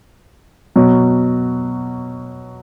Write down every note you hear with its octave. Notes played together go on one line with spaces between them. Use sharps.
B2 F#3